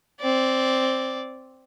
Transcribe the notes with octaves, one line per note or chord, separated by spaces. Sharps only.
C4 D5